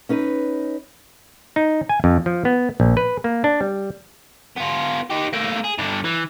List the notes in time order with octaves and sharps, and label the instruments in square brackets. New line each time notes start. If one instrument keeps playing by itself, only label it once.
[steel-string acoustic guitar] C#4 D#4 B4
[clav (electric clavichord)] D#4
G#5
F2
F3
B3
A#1
B4
A#3
D4
G3
[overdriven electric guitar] B3 F4
D#4 G4
A3 A#3
G#4
G2 D3
E3